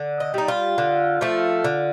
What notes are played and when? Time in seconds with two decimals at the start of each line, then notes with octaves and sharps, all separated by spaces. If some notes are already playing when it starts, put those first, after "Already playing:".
Already playing: D3
0.20 D#5
0.34 G3 D#4
0.48 F4
0.78 D3
1.21 F3 A3
1.64 D3